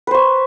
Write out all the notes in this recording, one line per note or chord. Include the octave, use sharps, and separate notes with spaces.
B4 C5 C#6